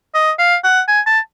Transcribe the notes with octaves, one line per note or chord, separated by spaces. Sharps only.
D#5
F5
F#5
G#5
A5